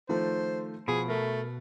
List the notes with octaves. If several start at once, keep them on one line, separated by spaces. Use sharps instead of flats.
D#3 F3 A3 C5
B2 F3 G#4
A3 A#4